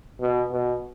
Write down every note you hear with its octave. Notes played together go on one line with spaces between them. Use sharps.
B2
B2